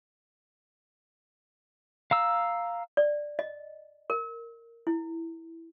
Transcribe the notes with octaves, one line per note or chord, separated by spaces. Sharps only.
F5 A#5 E6
D5
D#5
A#4
E4